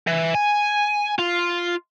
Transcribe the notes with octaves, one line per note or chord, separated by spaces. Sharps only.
E3
G#5
F4